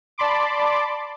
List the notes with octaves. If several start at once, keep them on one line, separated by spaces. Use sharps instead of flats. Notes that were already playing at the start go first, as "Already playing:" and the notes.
D5 A5 B5 C6 D6